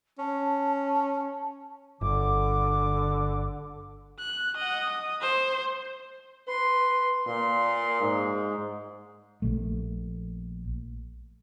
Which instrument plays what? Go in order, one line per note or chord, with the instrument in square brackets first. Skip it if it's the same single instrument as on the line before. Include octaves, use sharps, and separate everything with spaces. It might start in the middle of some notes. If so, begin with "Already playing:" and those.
[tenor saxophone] C#4 [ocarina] A5
[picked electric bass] G1 [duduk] D3 [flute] D6
[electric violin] F#6
D#5 F#5
D#6
C5
[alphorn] B4 [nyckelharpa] C6
[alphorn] A#2 [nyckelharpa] C6
[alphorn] G#2
[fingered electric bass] A#1 A#2 A3